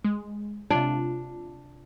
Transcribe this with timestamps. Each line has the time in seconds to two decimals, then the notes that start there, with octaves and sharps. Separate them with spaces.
0.05 G#3
0.70 C3 D4 F4